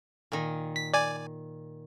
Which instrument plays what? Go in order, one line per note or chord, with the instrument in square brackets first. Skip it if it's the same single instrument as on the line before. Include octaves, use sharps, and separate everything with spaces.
[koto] A#2 D#3
[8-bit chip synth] B6
D5 G#5